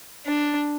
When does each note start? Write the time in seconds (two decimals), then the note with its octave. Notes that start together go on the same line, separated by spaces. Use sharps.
0.26 D4